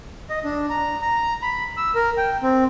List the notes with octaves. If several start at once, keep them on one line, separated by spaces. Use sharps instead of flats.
D#5
D4
A#5
A#5
B5
E6
A#4
G5
C4